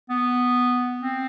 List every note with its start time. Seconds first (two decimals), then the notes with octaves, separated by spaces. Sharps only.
0.10 B3
1.00 C4